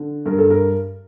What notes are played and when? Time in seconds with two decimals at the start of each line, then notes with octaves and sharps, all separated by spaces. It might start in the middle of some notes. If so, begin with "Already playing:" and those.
Already playing: D3
0.26 G2 A#4
0.39 A4
0.50 A#4